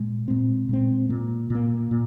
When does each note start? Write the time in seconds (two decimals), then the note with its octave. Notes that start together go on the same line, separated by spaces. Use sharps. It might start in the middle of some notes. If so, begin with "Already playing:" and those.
Already playing: A#2 G#3
0.28 A#2 G#3 C4
0.69 A#2 G#3 C4
1.09 A#2 A#3
1.50 A#2 A#3
1.91 A#2